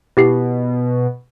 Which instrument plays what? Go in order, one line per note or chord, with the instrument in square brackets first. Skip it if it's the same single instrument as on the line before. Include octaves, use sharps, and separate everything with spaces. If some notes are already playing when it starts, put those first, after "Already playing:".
[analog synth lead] B2 [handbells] E4 G4 C7